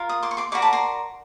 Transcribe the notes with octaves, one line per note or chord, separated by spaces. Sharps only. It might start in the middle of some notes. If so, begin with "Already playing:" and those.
Already playing: F4 A#4
D#6
C6 D6
C#6
C6 D6
F#4 A#4 D5 B5 C#6
A5 B5
A#5 C6